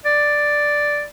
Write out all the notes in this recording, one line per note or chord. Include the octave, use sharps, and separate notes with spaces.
D5